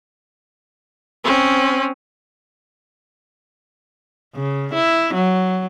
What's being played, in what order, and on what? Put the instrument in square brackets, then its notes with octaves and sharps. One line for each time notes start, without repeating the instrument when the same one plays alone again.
[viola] C4 C#4
[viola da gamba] C#3
E4
F#3